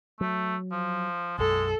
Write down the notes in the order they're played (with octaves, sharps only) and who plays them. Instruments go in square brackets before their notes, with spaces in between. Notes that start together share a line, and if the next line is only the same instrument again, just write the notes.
[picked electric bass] F#3 [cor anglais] A3
[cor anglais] F3
[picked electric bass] B1 F#2 [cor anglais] G#3 [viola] A4